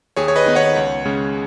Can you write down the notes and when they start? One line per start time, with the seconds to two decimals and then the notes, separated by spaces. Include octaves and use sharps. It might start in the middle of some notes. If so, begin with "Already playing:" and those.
0.16 D#2 G#4 C#5
0.28 C#5
0.36 B4 D#5
0.46 D#3 B3 D#4
0.55 C#5 F#5
0.76 C#2
1.06 C#3 G#3 C#4